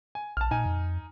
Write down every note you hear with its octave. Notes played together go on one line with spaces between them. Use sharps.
G#5
A#1 A5 F6
A#2 D#4 G#5
F2